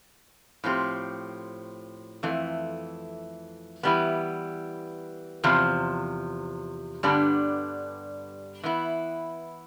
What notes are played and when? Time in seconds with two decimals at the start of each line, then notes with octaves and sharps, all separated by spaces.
0.64 A2 F3 C4 G4
2.23 F2 E3 A3
3.83 E3 G3 B3
5.44 E2 C3 F3
7.03 G2 D3 G3 B3 D4
8.63 E3 B3 E4